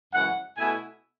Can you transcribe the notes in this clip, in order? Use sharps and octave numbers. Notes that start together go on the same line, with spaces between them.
F#2 C#3 E3 G#3 F#5
B2 A3 E4 G#5